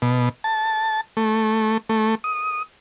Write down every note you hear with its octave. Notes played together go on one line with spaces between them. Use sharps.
B2
A5
A3
A3
D#6